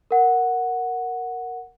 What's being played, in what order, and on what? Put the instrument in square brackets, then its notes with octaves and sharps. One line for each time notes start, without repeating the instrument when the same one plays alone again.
[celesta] A#4 F#5